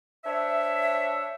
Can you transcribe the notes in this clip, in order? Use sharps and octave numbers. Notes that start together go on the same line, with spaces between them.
D4 C5 C#5 E5